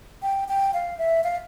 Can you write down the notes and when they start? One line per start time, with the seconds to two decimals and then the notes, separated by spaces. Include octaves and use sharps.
0.22 G5
0.48 G5
0.74 F5
0.98 E5
1.24 F5